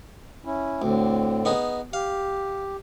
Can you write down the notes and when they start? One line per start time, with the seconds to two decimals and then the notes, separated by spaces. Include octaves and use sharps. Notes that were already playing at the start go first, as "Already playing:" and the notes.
0.45 C#4 E4
0.82 D2 A2 D3 C4
1.45 B3 D#4 G#4
1.93 G4 F5